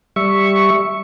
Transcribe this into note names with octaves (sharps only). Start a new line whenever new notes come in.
G3 E5 C#6